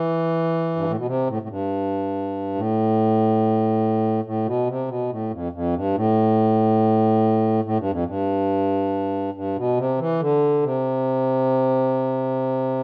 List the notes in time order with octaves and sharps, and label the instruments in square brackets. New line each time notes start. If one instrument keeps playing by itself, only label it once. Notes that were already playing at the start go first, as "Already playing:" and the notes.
Already playing: [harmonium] E3
G2
A2
B2
C3
A2
A2
G2
A2
A2
B2
C3
B2
A2
F2
F2
G2
A2
A2
G2
F2
G2
G2
B2
C3
E3
D3
C3